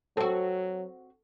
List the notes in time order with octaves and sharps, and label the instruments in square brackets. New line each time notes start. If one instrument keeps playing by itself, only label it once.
[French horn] F#3 [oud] C4 F#4 [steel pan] A4